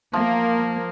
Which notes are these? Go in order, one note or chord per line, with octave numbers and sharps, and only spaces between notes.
F3 A#3